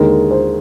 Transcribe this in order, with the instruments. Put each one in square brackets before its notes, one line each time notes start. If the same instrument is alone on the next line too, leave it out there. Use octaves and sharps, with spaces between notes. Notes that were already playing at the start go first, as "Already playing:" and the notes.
Already playing: [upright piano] D#2 D3 G#3 A#4
C5